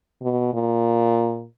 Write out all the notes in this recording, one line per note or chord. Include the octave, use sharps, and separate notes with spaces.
B2
A#2